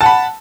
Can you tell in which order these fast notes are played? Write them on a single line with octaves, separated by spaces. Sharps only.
A5 F#5 B5